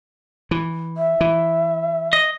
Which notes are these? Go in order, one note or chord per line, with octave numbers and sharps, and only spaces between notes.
E3
E5
E3
D#5